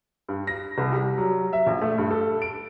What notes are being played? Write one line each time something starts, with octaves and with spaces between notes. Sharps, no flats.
G2
A#6
C2
G3
F#3
E5
A#1
A3
G2
A4
D7